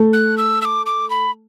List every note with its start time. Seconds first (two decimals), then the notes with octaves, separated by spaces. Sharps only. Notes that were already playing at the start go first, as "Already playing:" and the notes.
Already playing: A3
0.13 F#6
0.38 E6
0.62 E6
0.65 D6
0.86 D6
1.10 B5